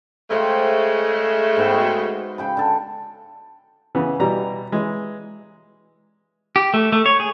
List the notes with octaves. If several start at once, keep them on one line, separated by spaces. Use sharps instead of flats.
C#3 G#3 A3 C5 F5 G5
G#2 B3 G5
F#4 C6
C#3 G5 B5
D3 A4
C#3 E3 B3
B2 E3 G3 A#5
E3 G#3
G4
A3
A3
C#5
G#4